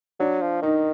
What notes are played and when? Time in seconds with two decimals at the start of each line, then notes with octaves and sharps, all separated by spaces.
0.20 F#3 D4
0.42 F3
0.62 D#3 D#4